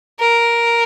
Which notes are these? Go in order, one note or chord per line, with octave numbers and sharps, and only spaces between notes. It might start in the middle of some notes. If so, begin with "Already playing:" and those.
A#4